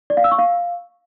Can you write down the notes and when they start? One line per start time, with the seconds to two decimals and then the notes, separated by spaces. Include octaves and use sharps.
0.10 D5
0.17 F5
0.24 E6
0.31 C#6
0.39 F5